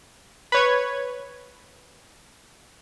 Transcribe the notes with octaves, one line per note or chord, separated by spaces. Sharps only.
B4 C#5 G#6